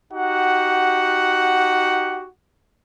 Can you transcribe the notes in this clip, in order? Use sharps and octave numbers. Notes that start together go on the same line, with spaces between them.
D#4 F#4 G4 F#5